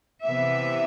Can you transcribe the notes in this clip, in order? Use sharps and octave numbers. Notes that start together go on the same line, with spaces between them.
C3 E3 B3 E5